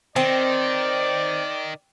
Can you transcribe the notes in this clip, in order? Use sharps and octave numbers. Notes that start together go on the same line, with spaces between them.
D#3 C4 D5